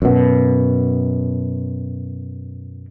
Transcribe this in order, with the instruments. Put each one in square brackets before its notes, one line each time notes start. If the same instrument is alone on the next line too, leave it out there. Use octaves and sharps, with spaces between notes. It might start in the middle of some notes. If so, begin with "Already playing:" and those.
[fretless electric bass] F#2 B2